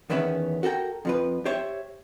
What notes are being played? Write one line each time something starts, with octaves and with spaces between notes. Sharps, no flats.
E2 D#3 B3 C#4 E5
F#4 A4 A#4 G5
F2 F3 B4
G4 C5 C#5 E5